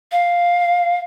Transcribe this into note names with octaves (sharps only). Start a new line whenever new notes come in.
F5